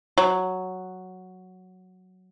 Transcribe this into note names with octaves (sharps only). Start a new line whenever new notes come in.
F#3